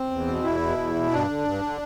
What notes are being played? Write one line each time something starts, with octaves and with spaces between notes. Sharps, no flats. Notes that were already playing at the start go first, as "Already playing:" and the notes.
Already playing: C4
E2
B2
E2 E4
B2
E2
B2
G2 D4
D3
G2
D3